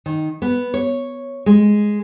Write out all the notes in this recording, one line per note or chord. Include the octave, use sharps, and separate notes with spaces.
D#3
B3
C#5
G#3